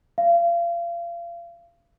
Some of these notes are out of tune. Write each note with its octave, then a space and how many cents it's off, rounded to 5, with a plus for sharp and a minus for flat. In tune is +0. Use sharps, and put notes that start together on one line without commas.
F5 -35